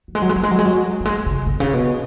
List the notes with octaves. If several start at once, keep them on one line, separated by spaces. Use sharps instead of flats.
F#3
G#3
F#3
G#3
F#3
G#3
F#3
G#3
F#3
F#3
G#3
C#3
B2
C#3
B2